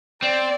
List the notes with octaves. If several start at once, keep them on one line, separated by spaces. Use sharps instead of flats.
C4 D5